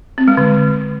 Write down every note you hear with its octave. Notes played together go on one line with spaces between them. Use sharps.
C4
G#3
D3